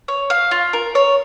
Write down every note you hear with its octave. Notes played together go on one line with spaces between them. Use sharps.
C#5
F5
F4
A#4
C#5